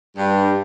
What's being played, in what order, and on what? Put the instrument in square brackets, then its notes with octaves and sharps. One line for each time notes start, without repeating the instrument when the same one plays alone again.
[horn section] G2